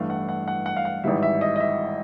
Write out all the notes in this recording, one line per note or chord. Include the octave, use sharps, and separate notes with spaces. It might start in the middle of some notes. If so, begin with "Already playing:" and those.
Already playing: A1 G2 E3 A3 D4 F5
F#5
F#5
F#5
F#5
F5
F#5
G#1 G#2 E3 G3 E5
E5
D#5
D#5
E5